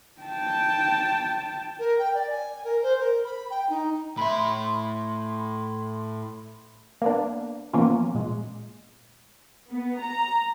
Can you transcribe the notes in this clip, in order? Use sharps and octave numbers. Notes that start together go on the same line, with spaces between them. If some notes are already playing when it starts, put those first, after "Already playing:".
G5 A5
A#4
G5
D5
G#5
A#4
C5
A#4
B5
G5
D#4
A2 E5 B5 C6
A#3 B3 D4
E3 F3 A#3 B3 C#4 F4
A#2 G#3
B3
A#5